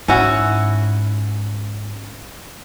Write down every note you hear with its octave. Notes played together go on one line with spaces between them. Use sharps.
G#2 C#4 E4 F#4